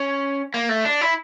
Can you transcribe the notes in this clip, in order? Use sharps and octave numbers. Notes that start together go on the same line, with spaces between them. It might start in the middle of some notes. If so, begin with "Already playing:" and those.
Already playing: C#4
A#3
A3
D4
E4